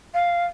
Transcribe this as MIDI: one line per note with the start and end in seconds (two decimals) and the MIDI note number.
0.14 0.45 77